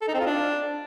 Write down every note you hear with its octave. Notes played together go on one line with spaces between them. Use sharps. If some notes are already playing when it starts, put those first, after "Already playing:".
A4
D#4
C4
F4
D4